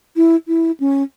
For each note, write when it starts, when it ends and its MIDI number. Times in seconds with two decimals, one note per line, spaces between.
0.16 0.36 64
0.48 0.71 64
0.80 1.03 61